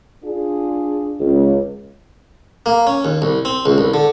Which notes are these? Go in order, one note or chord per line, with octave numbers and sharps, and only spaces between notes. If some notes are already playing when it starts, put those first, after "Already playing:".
D4 F4 G#4
C#2
A#3
C#4
D#2
C2
C4
C#2
C2
D3